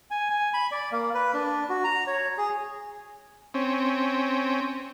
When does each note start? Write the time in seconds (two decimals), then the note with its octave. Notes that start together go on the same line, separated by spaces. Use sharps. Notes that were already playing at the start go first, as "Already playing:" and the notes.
0.11 G#5
0.30 G#5
0.54 B5
0.71 D5
0.92 A#3
1.14 B4
1.34 D4
1.69 F#4
1.84 A#5
2.07 C#5
2.38 G#4
3.54 C4 C#4